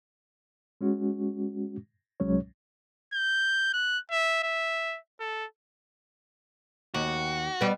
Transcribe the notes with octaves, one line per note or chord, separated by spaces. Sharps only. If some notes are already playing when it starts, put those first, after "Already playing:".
G#3 C#4 F#4
C2 F#3 G#3 C#4 C#5
G6
F#6
E5
E5
A4
D#2 F#4
G3 B3